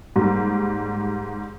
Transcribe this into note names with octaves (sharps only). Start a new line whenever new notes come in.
G#2 G3 A#3